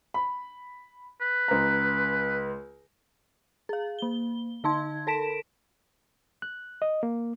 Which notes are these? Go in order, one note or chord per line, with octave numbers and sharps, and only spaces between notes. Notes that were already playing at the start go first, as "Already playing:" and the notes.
B5
B4
C#2 A#5
G#4 F5
A#3 G7
D3 D#4 A5 C6 G#6
A4 A#4 A5 B6 D7 E7
F#6
D#5
A#3